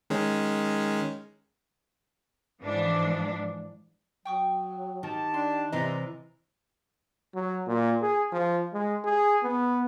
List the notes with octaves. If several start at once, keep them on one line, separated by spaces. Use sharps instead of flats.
D#3 G#3 C#4
G#2 E3 F3 D4
F#3 G5 C#6 D#6
D#3 G4 A5
D4 C6
C3 E3 B4 D5 D#5 A#5 C6
F#3
A#2
G#4
F3
G#3
G#4
B3